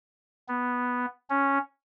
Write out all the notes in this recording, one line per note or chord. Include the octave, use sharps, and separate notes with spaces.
B3
C#4